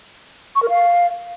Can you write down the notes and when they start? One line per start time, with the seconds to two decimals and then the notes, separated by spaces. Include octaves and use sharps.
0.55 C#6
0.62 A#4
0.69 F5